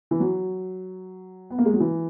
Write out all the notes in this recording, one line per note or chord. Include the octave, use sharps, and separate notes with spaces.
E3
F#3
B3
A#3
G#3
F#3
E3